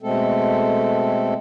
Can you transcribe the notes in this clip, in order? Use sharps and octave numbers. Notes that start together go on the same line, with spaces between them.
B2 G#3 A3 C4 A4